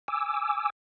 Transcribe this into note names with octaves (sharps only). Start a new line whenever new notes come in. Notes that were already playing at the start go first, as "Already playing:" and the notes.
G#5 D6 E6